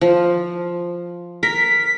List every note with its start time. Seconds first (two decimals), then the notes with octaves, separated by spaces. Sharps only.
0.01 F3
1.43 A#4 B6